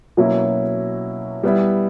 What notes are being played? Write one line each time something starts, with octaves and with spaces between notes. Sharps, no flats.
B2 F#3 A#3 C#4 E4
G3 B3 E4